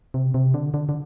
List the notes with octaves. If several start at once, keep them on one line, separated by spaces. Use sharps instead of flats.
C3
C3
D3
D3
D3